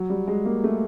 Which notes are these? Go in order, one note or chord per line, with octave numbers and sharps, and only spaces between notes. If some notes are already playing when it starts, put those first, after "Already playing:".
Already playing: F#3
G3
G#3
A#3
A3